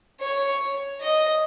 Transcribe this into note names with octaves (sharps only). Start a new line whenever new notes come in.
C#5
D#5